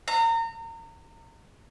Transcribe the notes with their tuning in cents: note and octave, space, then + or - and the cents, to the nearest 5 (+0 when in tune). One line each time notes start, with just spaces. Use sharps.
A#5 -30